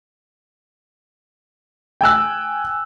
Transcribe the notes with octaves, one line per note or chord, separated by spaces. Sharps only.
G5 G#5 E6 F#6